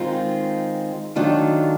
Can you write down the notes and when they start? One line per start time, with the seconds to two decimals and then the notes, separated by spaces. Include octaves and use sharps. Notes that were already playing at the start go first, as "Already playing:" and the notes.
Already playing: D#3 G#3 C4 F4
1.16 D#3 F#3 A3 D4 F4